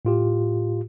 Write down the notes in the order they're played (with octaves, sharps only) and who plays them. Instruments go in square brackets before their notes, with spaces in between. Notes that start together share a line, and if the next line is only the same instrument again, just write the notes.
[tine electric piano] A2 F4 G4